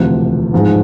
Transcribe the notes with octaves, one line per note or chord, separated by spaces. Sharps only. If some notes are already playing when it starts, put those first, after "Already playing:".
Already playing: E1 D2 C3 F3
A1 G#2 F3 G#3